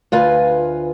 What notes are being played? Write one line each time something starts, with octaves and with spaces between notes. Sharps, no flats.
D2 F4 B4 G#5